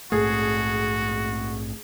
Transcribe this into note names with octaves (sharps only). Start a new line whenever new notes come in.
A#1 G#2 A3 F#4 G#4